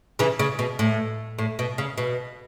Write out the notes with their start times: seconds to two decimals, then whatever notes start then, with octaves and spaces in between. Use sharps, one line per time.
0.19 C#3 E3
0.39 C#3
0.59 B2
0.79 A2
1.39 A2
1.59 B2
1.78 C#3
1.98 B2